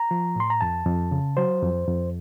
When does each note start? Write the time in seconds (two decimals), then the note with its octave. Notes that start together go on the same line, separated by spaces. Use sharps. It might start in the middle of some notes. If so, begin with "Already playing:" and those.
Already playing: A#5
0.11 F3
0.36 A2 C6
0.50 A#5
0.61 F2 A5
0.86 F2
1.11 C#3
1.37 F#3 C5
1.62 F2
1.87 F2